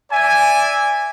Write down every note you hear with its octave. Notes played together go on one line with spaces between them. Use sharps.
D5 E5 G#5